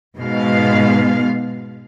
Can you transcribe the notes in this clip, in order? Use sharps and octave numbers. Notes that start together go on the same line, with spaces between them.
G#2 B2 G#3 B3 F5